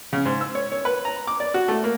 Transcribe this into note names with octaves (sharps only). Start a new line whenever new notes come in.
C#3
G#2
E6
C#5
C#5
B4
A#5
D6
D5
F#4
A3
A#3